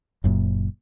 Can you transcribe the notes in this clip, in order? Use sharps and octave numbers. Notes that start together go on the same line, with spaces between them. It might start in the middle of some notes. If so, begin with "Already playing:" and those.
F#1 F#2 A#2